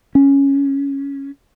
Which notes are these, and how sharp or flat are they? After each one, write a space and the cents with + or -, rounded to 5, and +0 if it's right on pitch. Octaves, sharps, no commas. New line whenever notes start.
C#4 +0